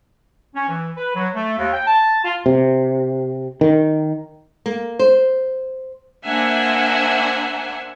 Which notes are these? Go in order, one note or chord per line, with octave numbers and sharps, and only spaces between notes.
C#4
E3
B4
F#3
A3
D#2
G5
A5
F4
C3
D#3
A#3
C5
A#3 D4 C5 E5 F#5 G#5